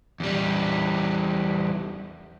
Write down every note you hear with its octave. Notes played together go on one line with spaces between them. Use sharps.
E2 G3